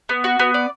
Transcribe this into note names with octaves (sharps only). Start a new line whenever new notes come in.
B3
F#4
B3
D5